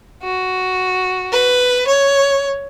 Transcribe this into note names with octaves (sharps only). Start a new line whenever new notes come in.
F#4
B4
C#5